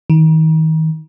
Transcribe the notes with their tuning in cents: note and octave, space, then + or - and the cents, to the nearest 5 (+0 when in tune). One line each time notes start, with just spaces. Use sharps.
D#3 +35